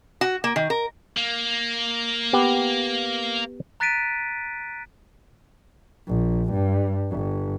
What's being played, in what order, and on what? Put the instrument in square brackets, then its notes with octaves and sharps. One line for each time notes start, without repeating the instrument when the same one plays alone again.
[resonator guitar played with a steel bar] F#4
A#3
D#3
A#4
[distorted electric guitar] A#3
[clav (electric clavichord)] B3 G4
[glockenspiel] A#5 F#6 A6 B6 D7 D#7
[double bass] A#1
G2
G1